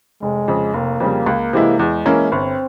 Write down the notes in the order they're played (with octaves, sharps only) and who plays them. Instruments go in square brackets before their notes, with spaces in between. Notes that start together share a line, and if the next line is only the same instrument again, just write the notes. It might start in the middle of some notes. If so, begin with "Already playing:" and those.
[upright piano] F1 [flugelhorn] G#3
[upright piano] F2 C#3
[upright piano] F1 [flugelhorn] A#3
[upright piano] F2 C#3 G3
C#2
C3 E3 G#3 E4
[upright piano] E2 [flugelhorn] G#3
[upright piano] E3 A#3 C#4 E4
[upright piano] G1 [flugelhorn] C4